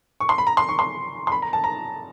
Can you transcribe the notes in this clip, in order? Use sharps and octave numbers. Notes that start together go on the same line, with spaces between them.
C#6
C6
B5
A#5
C6
C#6
C6
C6
B5
A#5
A5
A#5